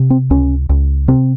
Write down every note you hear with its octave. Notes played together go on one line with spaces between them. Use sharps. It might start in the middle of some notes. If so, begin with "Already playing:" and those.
Already playing: C3
C4
C#2 C#4
C#2
C3 C4